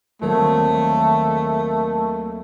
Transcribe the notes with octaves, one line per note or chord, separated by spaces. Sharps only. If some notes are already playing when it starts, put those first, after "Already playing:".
D#2 F#3 A3 C4